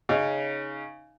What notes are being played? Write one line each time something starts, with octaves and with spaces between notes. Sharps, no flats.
C#3 C#4 D#4